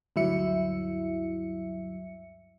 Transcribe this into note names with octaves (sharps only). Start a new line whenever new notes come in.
D2 G2 F#3 E4 E5 C#7